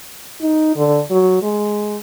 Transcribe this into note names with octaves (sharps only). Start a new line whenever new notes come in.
D#4
D3
F#3
G#3